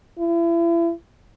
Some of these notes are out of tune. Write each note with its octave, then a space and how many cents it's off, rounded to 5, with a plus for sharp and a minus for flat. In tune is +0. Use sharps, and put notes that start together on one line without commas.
E4 +35